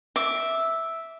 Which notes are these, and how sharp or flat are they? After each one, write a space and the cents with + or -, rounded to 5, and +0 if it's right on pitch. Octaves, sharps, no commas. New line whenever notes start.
E5 -5 D6 +0